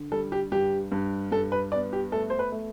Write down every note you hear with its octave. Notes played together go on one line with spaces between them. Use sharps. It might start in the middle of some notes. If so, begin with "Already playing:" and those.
Already playing: D3
G3 A4
G4
G2 G4
G2
G2 A4
B4
B3 D5
G4
A3 A4
C5
B4
A3